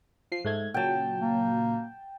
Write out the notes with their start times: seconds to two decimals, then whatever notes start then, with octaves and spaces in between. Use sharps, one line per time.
0.32 F3 C7
0.45 G#2 A3 G#6
0.74 A#2 C#3 F#3 G5 A5
1.21 A#3